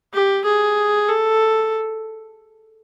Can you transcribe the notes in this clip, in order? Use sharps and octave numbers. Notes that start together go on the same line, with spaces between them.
G4
G#4
A4